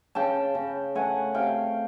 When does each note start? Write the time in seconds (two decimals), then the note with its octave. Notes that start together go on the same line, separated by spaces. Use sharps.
0.15 C#3 G5 A5
0.55 C#3
0.95 A3 F#5 G#5
1.34 C3 F5 G5